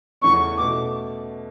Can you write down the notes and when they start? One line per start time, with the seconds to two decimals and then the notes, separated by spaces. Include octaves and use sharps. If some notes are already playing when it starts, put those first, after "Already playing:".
0.22 E2 C#3 E3 A3 C#4 C#6
0.58 B2 A3 D6